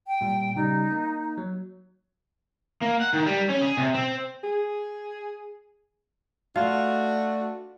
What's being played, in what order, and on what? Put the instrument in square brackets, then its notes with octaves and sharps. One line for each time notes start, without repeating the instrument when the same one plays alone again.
[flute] G5
[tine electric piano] A#2 G3
[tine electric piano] C#3 G3 [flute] D#4
[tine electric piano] A#3
F#3
[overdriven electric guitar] A#3
F#5
D#3
G3
C#4
G#4
C3
C4
[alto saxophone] G#4
[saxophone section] A3 D4 F#4 [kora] F4